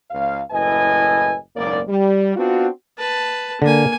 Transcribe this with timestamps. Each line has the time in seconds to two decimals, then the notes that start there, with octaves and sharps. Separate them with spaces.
0.11 C#2 F5
0.51 F#1 A2 E4 B4 D#5 G#5
1.56 F#1 B1 G#2 A#3 D5
1.88 G3
2.36 B3 C4 D4 F4 F#4
2.98 B4 A5
3.62 D3 A#3 G#5